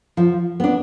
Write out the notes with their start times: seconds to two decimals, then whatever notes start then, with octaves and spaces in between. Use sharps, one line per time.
0.17 F3
0.60 B3 D4